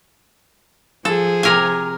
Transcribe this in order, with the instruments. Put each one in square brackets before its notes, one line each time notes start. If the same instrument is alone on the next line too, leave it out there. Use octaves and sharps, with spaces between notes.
[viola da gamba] F3 G#4 [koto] A4
[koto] C3 A#4 G#5